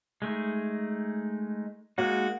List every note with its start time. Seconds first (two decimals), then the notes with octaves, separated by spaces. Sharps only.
0.22 G#3 A3 D#4
1.98 G#3 A#3 D#4 F#4